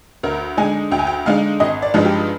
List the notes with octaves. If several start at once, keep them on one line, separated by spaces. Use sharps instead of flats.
D2 A#4
D3 G#3 D#4 G#5
D2 G5
G#5
G5
D3 G#3 D#4 F5
G#1 D#5
D5
G2 F3 G#3 D#4
G4